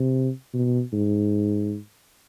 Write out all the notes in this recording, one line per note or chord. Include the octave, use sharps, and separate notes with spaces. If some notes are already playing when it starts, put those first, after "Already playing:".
Already playing: C3
B2
G#2